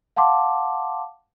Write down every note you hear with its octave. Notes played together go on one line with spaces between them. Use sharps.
F5 F#5 A5 C6 D6